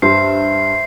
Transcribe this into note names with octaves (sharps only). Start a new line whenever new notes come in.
G2 C5 E5 C7